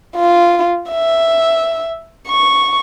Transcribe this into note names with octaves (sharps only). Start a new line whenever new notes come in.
F4
E5
C#6